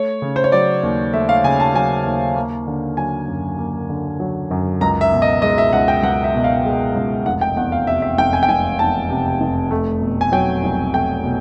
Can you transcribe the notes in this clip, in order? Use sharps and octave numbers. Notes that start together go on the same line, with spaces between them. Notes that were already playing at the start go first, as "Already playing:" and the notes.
Already playing: A3 C#5
C#3
C5
C#5
F#3 D5
D#2
A3 E5
F5
C#3 G#5
A5
F#3 G#5
D#2
A#3
D3
F#3 G#5
F#2
A#3
D3
F#3
F#2
C#2 A#5
E5
B2
D#5
G#3 D#5
E5
C#2 F#5
G5
C#2 F#5
E5
B2
F5
G#3
C#2
F1 F#5
G5
E2 F#5
F5
C3 E5
E5
F1 G5
G#5
G5
F1 G#5
E2 A5
C3
F1
A3
B2
G#5
F#3 G5
C2
A3 G5
B2